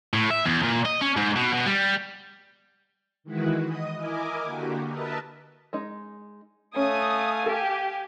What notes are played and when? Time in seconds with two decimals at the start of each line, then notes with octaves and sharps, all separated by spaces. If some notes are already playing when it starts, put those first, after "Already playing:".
0.14 A2
0.31 E5
0.46 E2
0.63 A#2
0.85 D#5
1.01 C#4
1.17 G#2
1.36 B2
1.53 B2
1.66 G3
3.24 D#3 E3 G#3 E4 F#4 B4
3.64 D#5 D#6
3.96 E4 A#4 D#5 G#5 D6
4.43 D3 A#3 F#4 G4
4.87 A#4 B4 D#5 E5 A5
5.73 G#3 D#4
6.76 A3 C#4 F5 G#5 D#6
7.46 G4 A4